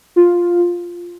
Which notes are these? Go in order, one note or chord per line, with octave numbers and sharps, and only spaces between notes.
F4